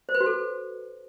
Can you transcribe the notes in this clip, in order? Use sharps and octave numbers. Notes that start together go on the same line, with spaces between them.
C5
B4
F#4
A4